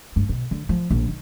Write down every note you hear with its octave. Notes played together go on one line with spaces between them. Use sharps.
G2
B2
D3
F3
A#1
D#3